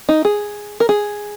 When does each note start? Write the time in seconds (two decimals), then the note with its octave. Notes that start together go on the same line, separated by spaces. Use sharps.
0.09 D#4
0.25 G#4
0.80 A#4
0.89 G#4